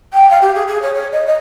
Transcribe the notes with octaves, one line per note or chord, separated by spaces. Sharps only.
G5
F5
G4
G#4
G#4
C#5
C#5
D#5
D#5